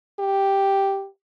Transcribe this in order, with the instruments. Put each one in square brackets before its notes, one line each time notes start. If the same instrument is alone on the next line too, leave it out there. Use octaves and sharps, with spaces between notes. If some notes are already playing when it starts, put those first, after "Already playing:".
[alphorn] G4